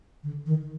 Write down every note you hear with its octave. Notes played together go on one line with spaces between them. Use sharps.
D3
D#3